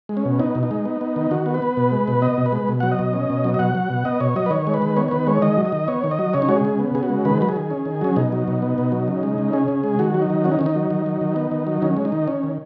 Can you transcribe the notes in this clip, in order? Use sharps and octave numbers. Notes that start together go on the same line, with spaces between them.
G#3
C#4
B2
B3 D#4
B2
D#4
G#3
B3
B3
D#3
D#3 F#4
B3
B4
B3
B2
G#3
B2
B3 D#5
B2
B4
G#3
B2
F#3 F#5
D#5
B2
C#4
B2
F#3
D#5
B2 F#5
F#3
B2
B3 D#5
B2 C#5
F#3 D#5
B4
D#3 C#5
G#3
B4
D#3
B3 C#5
C#5
D#3 B4
G#3 C#5
D#3 D#5
F#3
D#5
D#3
B3 C#5
D#3
D#5
F#3
C#3 C#5
D#4
G#3 F#4
G#4
C#3
B3
C#3 G#4
F#4
G#3
D#3 B4
F#3 B4
G#4
D#3
C#4
D#3
F#3 C#4
B2 D#4
F#3
B2
B3
B2
F#3
C#3
G#3
C#3
C#4 G#4
C#3
G#3
D#3 F#4
F#3
D#4
D#3
C#4 F#4
D#4
D#3 C#4
D#4
F#3
D#3
F#3
D#3
B3
D#3
F#3
D#3 C#4
G#3
D#4
D#3
C#4
D#3